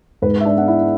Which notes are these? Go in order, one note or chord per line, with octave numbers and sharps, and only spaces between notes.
G#2 B4
E5
D4 D5
G#3 B3 F#5
E4 E5